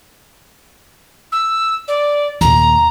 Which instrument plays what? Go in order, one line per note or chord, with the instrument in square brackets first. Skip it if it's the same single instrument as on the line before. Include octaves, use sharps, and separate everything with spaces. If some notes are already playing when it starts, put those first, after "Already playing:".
[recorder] E6
D5
[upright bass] D#2 A#2 [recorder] A#5